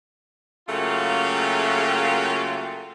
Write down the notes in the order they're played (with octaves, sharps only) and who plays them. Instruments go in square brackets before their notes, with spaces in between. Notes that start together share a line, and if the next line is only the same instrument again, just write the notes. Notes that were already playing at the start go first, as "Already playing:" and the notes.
[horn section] C#3 F#3 A3 A#3 F4 G5